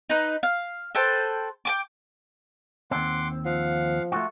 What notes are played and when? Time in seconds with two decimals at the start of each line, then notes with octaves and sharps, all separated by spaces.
0.10 D#4 B4
0.43 F5
0.95 A4 B4 C5 G5
1.65 G5 G#5 D6
2.91 D#2 C4 F#5 C6 D6
3.45 F3 F5 F#5
4.12 A3 F4 F#4